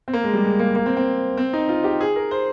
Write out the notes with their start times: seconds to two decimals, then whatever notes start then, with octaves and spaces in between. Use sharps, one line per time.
0.08 C4
0.13 A#3
0.24 G#3
0.33 G3
0.44 G#3
0.59 A#3
0.75 A#3
0.86 C4
0.97 C4
1.37 C4
1.53 D#4
1.69 F4
1.84 G4
2.01 G#4
2.16 A#4
2.31 C5